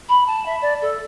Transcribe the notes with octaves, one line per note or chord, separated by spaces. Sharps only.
B5
A5
E5
D5
A4